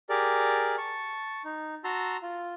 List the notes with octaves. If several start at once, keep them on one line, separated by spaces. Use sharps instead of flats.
G4 G#4 A#4 D5
A5 C#6
D#4
F#4 A5 A#5 C6 E6
F4